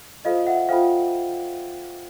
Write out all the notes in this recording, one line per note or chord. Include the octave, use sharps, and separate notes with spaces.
F4 A4 C5 D#5 F5
E5 F#5
F4 A4 C5 F5 G5